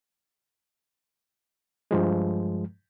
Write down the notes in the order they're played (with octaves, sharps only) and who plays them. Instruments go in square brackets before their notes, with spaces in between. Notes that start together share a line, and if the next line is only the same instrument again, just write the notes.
[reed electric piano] G2 F3 G#3